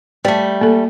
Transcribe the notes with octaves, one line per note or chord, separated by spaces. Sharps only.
G3 A3
A#3 A4